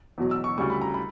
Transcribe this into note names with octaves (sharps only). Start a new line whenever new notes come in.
E2 B2 F#3
E6
C#6
D2 C#3 G3 C#6
B5
A#5
B5